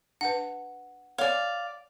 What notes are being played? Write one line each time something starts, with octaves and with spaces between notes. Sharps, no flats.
D4 B4 F#5
C#5 D5 F5 G#5